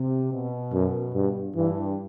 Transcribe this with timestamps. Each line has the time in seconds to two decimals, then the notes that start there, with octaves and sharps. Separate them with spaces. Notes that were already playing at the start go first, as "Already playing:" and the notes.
Already playing: C3
0.32 B2
0.73 F#2
1.14 G2
1.56 G2 E3